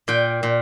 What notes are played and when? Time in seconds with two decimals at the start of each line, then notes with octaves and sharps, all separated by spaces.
0.08 A#2 G5
0.43 A#2